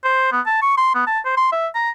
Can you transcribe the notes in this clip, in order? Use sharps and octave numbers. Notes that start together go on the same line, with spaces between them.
C5
B3
A5
C#6
C6
B3
A5
C5
C6
E5
A#5